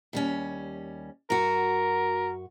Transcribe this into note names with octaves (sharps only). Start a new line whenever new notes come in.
D#2 G3 C#4
F#2 F#4 A#4